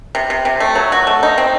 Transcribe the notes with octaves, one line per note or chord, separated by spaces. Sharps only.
C3
C3
C3
A3
F#3
F#4
A3
D#4
C4